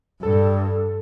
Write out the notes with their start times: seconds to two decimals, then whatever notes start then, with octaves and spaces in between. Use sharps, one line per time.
0.22 G2 A4